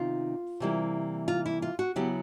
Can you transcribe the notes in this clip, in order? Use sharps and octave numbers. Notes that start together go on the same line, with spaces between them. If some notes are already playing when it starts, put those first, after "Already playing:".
Already playing: C3 D#3 B3 F4
C3 E3 G3 A#3
F4
E4
F4
F#4
C#3 F#3 B3 E4 G4